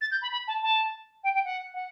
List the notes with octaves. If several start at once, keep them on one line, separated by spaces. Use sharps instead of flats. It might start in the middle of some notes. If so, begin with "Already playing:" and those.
A6
G6
B5
B5
A5
A5
G5
G5
F#5
F#5